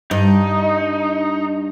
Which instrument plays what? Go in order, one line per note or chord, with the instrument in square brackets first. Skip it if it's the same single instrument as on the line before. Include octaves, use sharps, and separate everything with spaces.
[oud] G2 [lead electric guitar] D#4